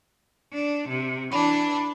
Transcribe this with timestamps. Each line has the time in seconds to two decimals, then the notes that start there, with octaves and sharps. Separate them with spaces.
0.52 D4
0.87 C3
1.32 E3 D4 B5